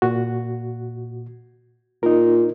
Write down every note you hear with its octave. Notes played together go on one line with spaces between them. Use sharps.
A#2 F#4
A#2 D#4 A#4